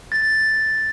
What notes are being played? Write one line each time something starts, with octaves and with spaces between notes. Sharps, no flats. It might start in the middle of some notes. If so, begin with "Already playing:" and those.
A6